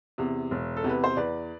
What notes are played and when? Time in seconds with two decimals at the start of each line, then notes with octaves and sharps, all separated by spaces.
0.18 E2 C3
0.51 E1
0.77 A4
0.84 E2 C3
0.89 B4
1.04 C5
1.17 E2 B4 D5